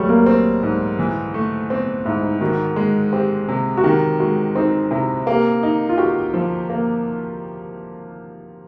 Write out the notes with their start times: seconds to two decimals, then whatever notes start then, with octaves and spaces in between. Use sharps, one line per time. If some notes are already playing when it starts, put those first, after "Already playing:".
Already playing: F#3 G3 A3
0.09 A#3
0.26 C4
0.63 G#2
0.99 E3
1.34 A3
1.69 B3 C4
2.05 G#2 E4
2.23 D#4
2.41 D#3 F#4
2.76 G#3
3.13 C4 G4
3.49 C3
3.77 F#4
3.84 D#3 G4
4.20 G#3 F#4
4.55 C4 D#4
4.91 C3 E4
5.27 A#3 G4
5.63 D#4
5.89 F4
5.98 F#4 G4
6.34 F3
6.70 A#3